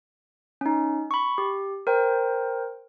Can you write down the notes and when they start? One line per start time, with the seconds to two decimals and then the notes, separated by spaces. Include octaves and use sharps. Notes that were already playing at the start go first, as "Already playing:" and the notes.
0.61 C#4 D#4
1.11 B5 C#6
1.38 G4
1.87 A#4 C5 G5